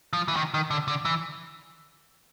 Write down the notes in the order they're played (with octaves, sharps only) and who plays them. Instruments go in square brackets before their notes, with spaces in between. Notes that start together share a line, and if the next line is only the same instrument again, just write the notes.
[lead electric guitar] F3
E3
D#3
D#3
D3
D3
E3